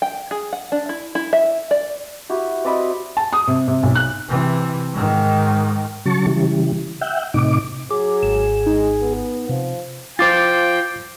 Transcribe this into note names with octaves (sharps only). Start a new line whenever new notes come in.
G5
G#4
F#5
D4
E4
E4
E5
D5
E4 F#4 G4
C4 D5 D#5 B5
A5
D#6
C3
C3
B1
F#6
C3 E3
G#2 D#3
C#3 F#3 A5 C#6
C#3 E3 G3
E5 F#5 G5
A2 C3 D#4 D6
F#3 G#4 D6
G#1 E7
G#3 D#4
B3
C3 F3 C4
F4 C5 G5 D6 A6